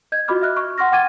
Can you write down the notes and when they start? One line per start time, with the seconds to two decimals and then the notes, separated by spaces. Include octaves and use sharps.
0.12 D#5 G6 G#6
0.28 F4 F#4 D#5 B5 D6 F6
0.42 E5 F6 F#6
0.57 C#6
0.78 F#5 C6 C#6 F6 A#6
0.92 F#5 G5 D6 G#6 A6 D#7